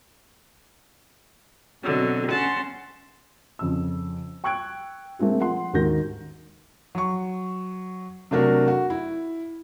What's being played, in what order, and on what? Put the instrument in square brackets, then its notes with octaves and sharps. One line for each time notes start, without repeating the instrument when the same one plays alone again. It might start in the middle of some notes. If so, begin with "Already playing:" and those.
[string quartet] B2 D3 F#3 C4
C#4 F#5 A5 C6
[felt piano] F2 C#3 E6
G5 C#6 E6 F#6 G#6 D7
A3 A#3 C4 G#4
F3 F#5 C6
D#2 G#2 D#3 F#4 G6 A#6
F#3 C#6
C3 F#3 A3 D4 F#4 A#4
F#4
E4